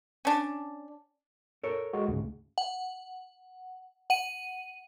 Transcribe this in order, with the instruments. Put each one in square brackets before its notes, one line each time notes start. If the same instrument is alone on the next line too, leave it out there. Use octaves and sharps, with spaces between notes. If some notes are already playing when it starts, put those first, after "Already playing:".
[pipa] C#4 D4
[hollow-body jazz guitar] A4 A#4 C#5
[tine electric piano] G#3 F#4
D2 G#2 C#3
[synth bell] F#5
F#5 D#7